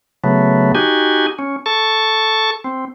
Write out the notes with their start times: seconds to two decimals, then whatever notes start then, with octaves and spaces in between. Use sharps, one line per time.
0.24 C#3 F#3 A3 B3
0.75 D#4 F#4 G4 G#5
1.39 C#4
1.66 A4 A5 C#6
2.64 C4